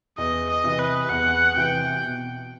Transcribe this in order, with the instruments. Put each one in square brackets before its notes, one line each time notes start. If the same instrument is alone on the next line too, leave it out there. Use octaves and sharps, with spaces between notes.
[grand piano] E2 [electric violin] D#5
[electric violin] D#5
[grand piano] C3 E3
[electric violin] B4
[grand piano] E2 [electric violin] F#5
[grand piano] C3 E3 [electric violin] G5
[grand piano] B2